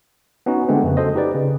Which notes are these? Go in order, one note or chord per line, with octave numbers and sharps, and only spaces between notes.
B3 C#4 D#4 F#4
D3 G#3 A3 B3 C4
F2 C#3 A#3
F#4 A4 C5 D#5
D#4 G4 B4 D5
C#3